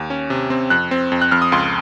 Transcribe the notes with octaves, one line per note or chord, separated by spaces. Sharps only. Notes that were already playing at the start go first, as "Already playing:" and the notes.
Already playing: D#2
C#4
C3
C4
F2 F#6
C4
F2
F#6
F2 F6
D#6
C#2 C6